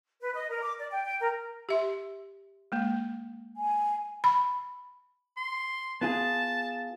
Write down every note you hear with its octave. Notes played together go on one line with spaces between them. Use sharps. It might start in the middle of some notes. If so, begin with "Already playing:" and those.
B4
D#5
A#4
D6
D5
G5
G5
A#4
G4 E5 C6
G#3 A#3
G#5
B5
C6
B3 F4 G#4 A5